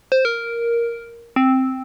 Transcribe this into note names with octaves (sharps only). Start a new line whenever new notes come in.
C5
A#4
C4